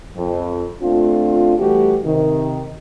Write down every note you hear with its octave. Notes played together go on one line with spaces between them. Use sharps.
F2
A3 C4 D4 F4
E3 G3 A3 F#4 G4
C3 D#3